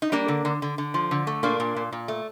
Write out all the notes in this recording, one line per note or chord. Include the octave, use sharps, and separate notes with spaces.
D#4
G3 A#3 D4
D3
D3
D3
D3
F3
D3
A3
A#2 A#3 D4
A#2
A#2
A#2
A3